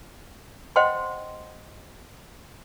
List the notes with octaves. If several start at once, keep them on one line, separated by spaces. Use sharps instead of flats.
C5 D#5 F#5 G5 C6